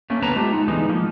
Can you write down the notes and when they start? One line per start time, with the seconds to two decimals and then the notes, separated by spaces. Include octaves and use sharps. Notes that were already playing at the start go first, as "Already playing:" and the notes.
0.10 A3 A#3 C#4
0.22 D3 B3 A4 B4 A5 A#5
0.36 G#3 A3 F4 G4
0.53 D#4
0.68 D3 E3 G#3 B3 D#4
0.88 F3 A#3